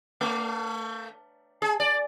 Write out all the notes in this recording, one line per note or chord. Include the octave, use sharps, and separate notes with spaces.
A3
G#4
D5